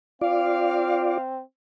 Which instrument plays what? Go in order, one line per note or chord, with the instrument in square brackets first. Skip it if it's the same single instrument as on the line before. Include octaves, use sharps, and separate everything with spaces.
[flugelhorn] C4 [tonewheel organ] F4 D5 [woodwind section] F5